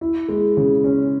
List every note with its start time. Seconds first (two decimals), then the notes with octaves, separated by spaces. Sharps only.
0.01 E4
0.28 G#3
0.57 C#3
0.84 C#4